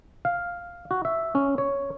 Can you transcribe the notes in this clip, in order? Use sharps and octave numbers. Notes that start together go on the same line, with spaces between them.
F5
F#4
E5
C#4
C#5